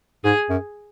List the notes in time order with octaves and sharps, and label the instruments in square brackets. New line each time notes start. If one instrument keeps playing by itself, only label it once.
[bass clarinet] G#2 [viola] G#4
[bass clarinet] F#2